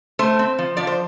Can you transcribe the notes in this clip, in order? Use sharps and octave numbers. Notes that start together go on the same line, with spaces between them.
A3 C5
C4
F3
F3 D5
C5